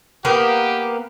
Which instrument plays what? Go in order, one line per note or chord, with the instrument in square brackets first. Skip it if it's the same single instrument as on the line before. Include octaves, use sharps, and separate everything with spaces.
[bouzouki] A#3 B3 [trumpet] G4